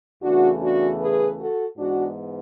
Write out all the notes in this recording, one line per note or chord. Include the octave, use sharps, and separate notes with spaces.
E2 C#3 E3 A3 D4 F#4
D4 F#4
G#4 B4
F#4 A4
G#2 E3 G#3 B3 D4 F#4